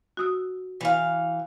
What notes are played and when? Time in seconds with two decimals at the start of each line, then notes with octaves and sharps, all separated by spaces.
0.17 F#4 D#6 E6
0.81 E3 F5